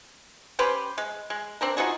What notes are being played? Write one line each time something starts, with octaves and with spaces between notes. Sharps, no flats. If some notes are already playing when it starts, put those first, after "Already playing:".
C#4 G4 B4 C5
G#3
G#3
C4 D4 A#4
D#4 F4 F#4 G#4